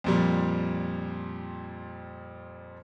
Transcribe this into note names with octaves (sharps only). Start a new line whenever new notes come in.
F2 A#2 G3